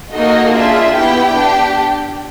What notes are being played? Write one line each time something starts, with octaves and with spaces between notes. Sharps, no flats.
A#3 D#4 F#4 A4 D#5
D4 F4 G#4 E5
B3 E4 G4 G5
D4 G4